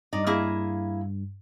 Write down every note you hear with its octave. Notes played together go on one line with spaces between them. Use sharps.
G2 D#4 D5
A#3 E4 G#4